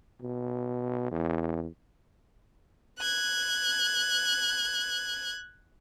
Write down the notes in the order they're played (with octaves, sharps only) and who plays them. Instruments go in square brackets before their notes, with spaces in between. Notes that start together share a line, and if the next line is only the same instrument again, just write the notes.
[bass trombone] B2
E2
[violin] F#6 G#6